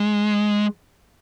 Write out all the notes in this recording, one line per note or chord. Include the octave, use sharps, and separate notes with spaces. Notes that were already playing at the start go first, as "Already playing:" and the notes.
Already playing: G#3